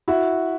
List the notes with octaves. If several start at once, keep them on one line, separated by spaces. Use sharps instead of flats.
E4 F#4